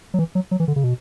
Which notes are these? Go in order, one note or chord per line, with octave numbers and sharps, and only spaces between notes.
F#3
E3
F#3
F#3
E3
D3
C#3
B2